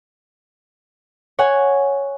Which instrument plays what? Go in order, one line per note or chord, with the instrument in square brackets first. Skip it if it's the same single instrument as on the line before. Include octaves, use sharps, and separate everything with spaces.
[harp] C#5 F#5 G#5